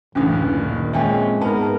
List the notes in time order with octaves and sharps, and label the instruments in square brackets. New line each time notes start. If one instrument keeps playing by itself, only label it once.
[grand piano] F#1 D2 [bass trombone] A2 [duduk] E3 [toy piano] C#4 D4 D#6
[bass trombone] A#2 [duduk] D#3
[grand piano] F2 C#4 [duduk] G#3 [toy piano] E5 G5 G#5
[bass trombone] G#2 [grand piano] B3 [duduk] A#4 [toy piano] A5 B5